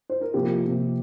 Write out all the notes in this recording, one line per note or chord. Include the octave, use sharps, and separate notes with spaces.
C5
A#4
C3 F3 A#3 G4
C3 F3 A#3